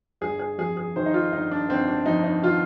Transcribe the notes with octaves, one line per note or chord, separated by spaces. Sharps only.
G1 G#4
G#4
F2 G#4
G#4
D#3 C5
D#4
F4
G1 D#4
D4
G1 C4
D4
F2 D#4
D#4
D#3 F4